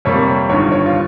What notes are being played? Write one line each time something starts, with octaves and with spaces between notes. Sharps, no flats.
F2 C3 G3 A#3 C#5
C#5
G1 G2 D#3 C#5
C#5
F4